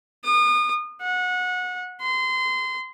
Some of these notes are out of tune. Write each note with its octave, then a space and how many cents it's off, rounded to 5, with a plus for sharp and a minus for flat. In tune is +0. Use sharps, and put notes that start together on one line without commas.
D#6 -35
F#5 -25
C6 -25